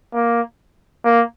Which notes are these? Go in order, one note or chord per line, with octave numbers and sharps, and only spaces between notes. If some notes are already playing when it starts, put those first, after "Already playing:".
A#3
A#3